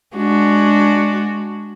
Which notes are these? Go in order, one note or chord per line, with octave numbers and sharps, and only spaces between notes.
G#3 D4 F#4